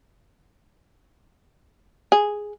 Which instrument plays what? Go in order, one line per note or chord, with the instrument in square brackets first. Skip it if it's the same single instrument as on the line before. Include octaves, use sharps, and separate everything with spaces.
[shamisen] G#4